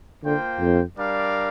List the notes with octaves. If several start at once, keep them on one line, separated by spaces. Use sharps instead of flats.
D3 A#3 F4 C5 G5
F2
G3 D4 A#4 D5 F5